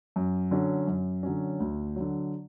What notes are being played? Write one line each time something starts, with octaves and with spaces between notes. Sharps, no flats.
F#2
D3 F#3 C#4
F#2
D3 F#3 C#4
D2
D3 F#3